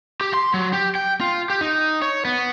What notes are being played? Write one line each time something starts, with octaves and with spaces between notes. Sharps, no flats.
G4
C6
F#3
G4
G5
F4
G4
D#4
C#5
B3